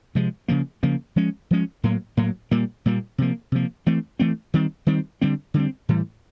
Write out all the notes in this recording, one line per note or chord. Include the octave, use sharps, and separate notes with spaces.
C3 F3 G#3
C#3 F3 A#3
C#3 F3 A#3
F3 G#3 C#4
F3 G#3 C#4
A2 F#3 A#3
A2 F#3 A#3
A#2 G3 A#3
A#2 G3 A#3
C3 F3 A#3
C3 F3 A#3
E3 A3 C4
E3 A3 C4
D#3 G3 C4
D#3 G3 C4
D3 G3 C4
D3 G3 C4
A2 E3 G3